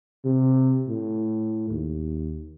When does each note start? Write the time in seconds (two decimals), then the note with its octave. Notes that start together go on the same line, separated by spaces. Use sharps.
0.25 C3
0.88 A2
1.70 D#2